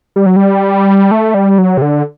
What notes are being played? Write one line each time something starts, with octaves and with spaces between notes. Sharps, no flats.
G3
F#3
G3
A3
G3
F#3
C3
D3